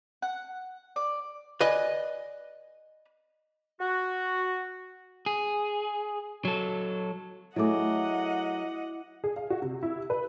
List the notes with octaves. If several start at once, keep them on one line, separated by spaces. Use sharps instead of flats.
F#5
D5
B4 D5 D#5 G#5
F#4
G#4
F#3 A4
F#3 A3 E4 G#4 D#5 F#5 D6
G#4
F5
F#4
C3
E4
G4
B4